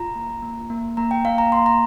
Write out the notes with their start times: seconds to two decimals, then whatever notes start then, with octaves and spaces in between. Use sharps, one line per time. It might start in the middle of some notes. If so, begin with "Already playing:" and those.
Already playing: F4 A#5
0.15 A#3
0.43 A#3
0.70 A#3
0.97 A#3 A#5
1.11 G5
1.25 A#3 F5
1.38 A#5
1.52 A#3 C6
1.66 A#5